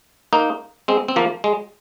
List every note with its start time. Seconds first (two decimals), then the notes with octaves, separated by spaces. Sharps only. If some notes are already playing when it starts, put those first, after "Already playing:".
0.33 A#3 D#4
0.88 G#3 C4
1.08 C4
1.16 F3 A#3
1.44 G#3